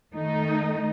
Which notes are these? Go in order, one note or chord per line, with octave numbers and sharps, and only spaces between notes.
D#3 A3 D#4